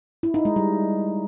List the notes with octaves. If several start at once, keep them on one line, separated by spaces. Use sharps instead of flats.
E4
D#4
G#3
G3